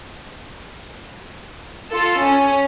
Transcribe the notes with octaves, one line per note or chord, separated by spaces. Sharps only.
F4 A4
C#4